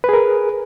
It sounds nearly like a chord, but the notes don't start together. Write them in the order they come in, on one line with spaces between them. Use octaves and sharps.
B4 G#4 A#4